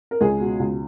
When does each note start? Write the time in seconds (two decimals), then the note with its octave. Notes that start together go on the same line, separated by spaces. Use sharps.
0.11 A#4
0.21 C#2 G#3 G#4
0.40 B2
0.59 C#2